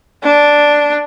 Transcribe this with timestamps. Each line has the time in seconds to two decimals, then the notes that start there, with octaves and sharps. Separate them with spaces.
0.24 D4